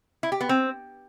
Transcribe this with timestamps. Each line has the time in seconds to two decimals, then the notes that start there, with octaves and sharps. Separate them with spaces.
0.23 E4
0.32 G4
0.41 B3
0.49 C4